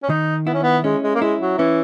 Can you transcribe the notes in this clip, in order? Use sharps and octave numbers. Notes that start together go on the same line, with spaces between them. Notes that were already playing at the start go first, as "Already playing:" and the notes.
C#4
D#3 D#4
B3 E4
C#4
B3
G#3 C#4
G#3
A#3
G#3 E4
F#3
E3 C#4